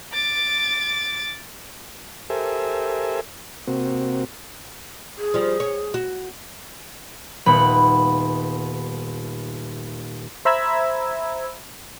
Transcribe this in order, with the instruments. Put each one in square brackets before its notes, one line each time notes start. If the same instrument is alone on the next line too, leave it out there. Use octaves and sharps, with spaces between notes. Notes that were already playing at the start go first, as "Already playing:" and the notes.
[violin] D6 A6
[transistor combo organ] G4 A4 A#4 C5 E5 G#5
C3 A#3 C4 F#4
[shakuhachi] G#4
[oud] F3 G3
C#5
F#4
[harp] D#1 B3 B5
[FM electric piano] C5 E5 A#5 B5 E6 G#6